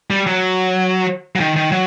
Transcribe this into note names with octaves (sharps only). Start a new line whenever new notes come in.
G3
F#3
F#3
D#3
D#3
F#3